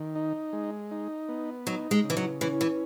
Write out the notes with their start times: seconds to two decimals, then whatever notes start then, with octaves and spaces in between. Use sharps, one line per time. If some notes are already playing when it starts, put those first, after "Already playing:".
Already playing: D#3
0.15 D#4
0.53 G#3
0.91 D#4
1.29 B3
1.66 F#3 D#4
1.91 G#3
2.04 C#3
2.10 E3
2.17 F#3
2.41 E3 C#4
2.61 E3